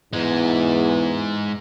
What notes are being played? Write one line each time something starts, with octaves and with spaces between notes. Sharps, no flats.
E2 G#2 G#3